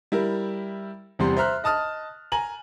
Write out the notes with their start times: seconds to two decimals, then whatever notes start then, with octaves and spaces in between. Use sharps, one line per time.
0.12 G3 E4 A#4
1.19 E2 C3 G3 C6
1.37 C5 E5 A#5 F6 F#6
1.64 D#5 A5 D#6 F6
2.32 G#5 A#5 F#7